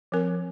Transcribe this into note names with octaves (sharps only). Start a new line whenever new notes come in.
F3 C4 A#4